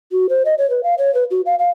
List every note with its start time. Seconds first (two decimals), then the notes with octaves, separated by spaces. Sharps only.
0.12 F#4
0.29 C5
0.45 D#5
0.58 C#5
0.70 B4
0.83 F5
0.98 C#5
1.14 B4
1.31 F#4
1.46 F5
1.59 F5